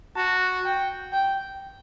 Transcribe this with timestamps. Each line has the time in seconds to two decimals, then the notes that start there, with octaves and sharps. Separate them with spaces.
0.16 F#4 A5
0.65 G5
1.12 G5